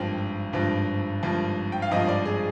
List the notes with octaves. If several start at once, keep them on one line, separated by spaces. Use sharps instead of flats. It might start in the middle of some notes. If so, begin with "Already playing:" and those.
Already playing: G#1 G2 F3 G5
G#1 G2 F3
G#1 G2 F3
G5
F5
G#1 G2 F3 D#5
D5
G#4